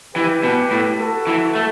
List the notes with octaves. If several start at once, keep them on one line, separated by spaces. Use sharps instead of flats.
E3 G4 B4
B2
A2
F#4 A4
E3
A3